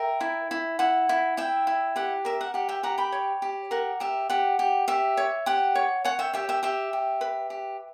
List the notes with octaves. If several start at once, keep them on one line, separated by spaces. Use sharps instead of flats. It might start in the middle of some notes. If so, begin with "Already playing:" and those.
Already playing: A#4 E5 G5
E4
E4
E4 F#5
E4
E4 E5 G5
E4
G4 F#5
A#4 E5
F#5
G4 F#5
E5 G5
G4 F#5 A#5
G5 B5
C#5
G4
A#4 F#5
G4 E5
G4 F#5
G4
G4 E5
C#5
G4 F#5
C#5
C#5 F#5
E5 G5
G4 E5 G5
E5 G5
G4 E5 G5
G4
B4
G4